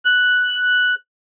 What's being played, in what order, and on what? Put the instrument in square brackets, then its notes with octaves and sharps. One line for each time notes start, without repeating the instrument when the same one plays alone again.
[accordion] F#6